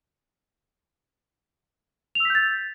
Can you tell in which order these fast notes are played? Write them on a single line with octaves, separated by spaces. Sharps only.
F7 E6 B6 G6 A6